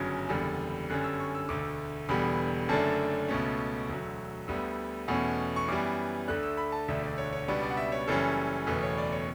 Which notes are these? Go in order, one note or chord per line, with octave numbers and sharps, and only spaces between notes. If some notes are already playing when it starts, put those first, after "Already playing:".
Already playing: G1 F#2 C#3 F#3
F#1 E2 D3 G3
G1 F#2 D3 G3 C#4 F#6
E6
C#6
E6
E1 D2 D3 A3 D6
E1 E2 D3 G3 B3 B5
F#1 F#2 D3 A3 D4 A5
C#2 B2 A3 C#4
E1 D2 D3 F#3
D2 D3 G3 B3
E2 B2 A3 C#4 F#5
C#6
F#2 E3 G3 B3 D6
D2 D3 A3 D4 F#6
E6
B5
A5
E1 D2 D3 A3 D4 E5
D5
C#5
C#5
C#2 B2 G3 B3 D4
D5
F#5
E5
C#5
F#1 F#2 E3 G3 C#4 A4
F#1 E2 B2 A3 B4
C#5
D5
C#5